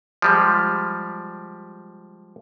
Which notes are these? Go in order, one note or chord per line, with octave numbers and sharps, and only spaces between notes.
F3 G3 G#3